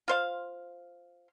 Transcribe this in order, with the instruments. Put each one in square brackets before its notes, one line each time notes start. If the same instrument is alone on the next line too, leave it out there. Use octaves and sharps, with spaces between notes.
[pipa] F4 C5 F5